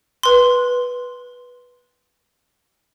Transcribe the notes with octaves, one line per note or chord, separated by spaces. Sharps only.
B4 C6